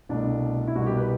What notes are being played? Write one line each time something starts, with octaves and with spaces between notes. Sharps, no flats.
C2 B2 A3 D4
E4
C2 B2 G3 F#4
G4
B4